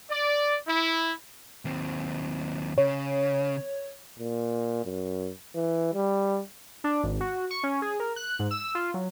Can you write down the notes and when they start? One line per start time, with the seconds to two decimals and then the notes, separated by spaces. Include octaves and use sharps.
0.10 D5
0.68 E4
1.65 D#2 C4
2.78 C#3 C#5
4.19 A#2
4.86 F#2
5.55 E3
5.94 G3
6.84 D4
7.03 G#1
7.20 F#4
7.51 C#6
7.63 C#4
7.82 G#4
8.00 A#4
8.16 F#6
8.39 G#2
8.51 E6
8.75 F4
8.94 F#3